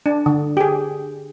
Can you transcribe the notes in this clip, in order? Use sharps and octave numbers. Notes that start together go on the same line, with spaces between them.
D4
D3
G4 G#4